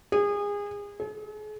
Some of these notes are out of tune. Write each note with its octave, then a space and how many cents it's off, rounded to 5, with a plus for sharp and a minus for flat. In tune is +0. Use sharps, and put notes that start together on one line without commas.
G#4 -30
G#4 +45